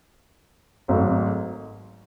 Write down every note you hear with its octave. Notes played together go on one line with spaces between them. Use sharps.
G#1 G#2 F#3 A3